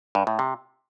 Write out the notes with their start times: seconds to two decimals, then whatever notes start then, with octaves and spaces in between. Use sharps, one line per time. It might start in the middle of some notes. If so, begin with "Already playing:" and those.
0.15 G2
0.27 A2
0.39 C3